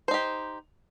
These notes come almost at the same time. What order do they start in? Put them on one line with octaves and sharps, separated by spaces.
C5 D#4 G4